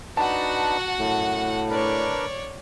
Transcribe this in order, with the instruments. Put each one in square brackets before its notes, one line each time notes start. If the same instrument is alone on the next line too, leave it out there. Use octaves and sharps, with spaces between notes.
[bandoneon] D4 D#4 B4 [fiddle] F#4 F#5 [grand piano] A5
[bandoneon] F#2 [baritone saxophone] A2
[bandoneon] D4 A#4 B4 [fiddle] C#5 D5